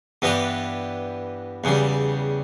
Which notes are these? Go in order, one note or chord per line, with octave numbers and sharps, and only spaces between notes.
G2 E3 B3 D4 G4
E2 C#3 G3